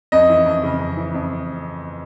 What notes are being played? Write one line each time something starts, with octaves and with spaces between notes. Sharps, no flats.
F2 D#5
E3
F2
C#3
F2
E3
F2